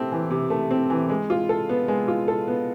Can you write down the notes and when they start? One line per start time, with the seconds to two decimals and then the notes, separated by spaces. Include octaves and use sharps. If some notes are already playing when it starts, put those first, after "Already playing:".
Already playing: C3 A3 C4
0.12 E3
0.31 C3
0.50 A3
0.71 C4
0.90 E3
1.10 G#3
1.30 F4
1.49 A4
1.69 B3
1.88 G#3
2.08 F4
2.28 A4
2.48 B3